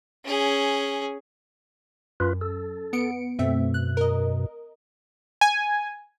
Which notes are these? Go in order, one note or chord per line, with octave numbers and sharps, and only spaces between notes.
C#4 G#4
F#2 F4 B4
A4
B3 C#7 D7
F#2 B2 A3 C4 E5
F#6
A#4 D#5
G#5